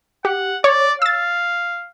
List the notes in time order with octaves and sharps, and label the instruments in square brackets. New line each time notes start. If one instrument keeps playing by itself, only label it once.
[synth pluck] G4 [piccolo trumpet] F#5
[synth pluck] C#5 [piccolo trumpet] D5
[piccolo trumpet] F5 [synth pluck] E6 A6